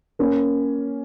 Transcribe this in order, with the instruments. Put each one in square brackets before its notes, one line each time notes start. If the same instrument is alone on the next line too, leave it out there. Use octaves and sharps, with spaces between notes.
[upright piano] A#3 C#4